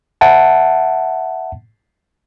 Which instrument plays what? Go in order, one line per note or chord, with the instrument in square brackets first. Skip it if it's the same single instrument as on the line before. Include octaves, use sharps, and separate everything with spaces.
[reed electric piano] E5 F#5 A5